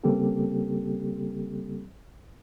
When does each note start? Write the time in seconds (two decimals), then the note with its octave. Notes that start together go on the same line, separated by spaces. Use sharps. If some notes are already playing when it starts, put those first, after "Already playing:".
0.04 C#3 G3 A#3 C4 G4 A4